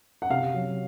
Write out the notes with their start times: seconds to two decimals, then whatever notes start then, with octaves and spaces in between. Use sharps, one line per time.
0.22 F#5
0.30 C3 F5
0.54 F#3